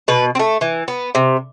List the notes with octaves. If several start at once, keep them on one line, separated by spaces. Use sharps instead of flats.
B2 B4
C4
A3
E3
B3
C3